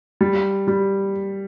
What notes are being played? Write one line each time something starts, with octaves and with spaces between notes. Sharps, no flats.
G3
G3